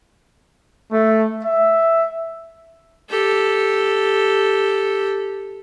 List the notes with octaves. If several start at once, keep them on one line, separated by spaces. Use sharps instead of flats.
A3
E5
G4 A4